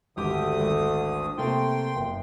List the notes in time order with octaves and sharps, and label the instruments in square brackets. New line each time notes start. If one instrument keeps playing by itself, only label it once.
[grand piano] G#1 G4 D6 [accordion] D2 D3 D#6
[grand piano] G#1
[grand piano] C3 A3 A#3 [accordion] G5 C6
[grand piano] F#1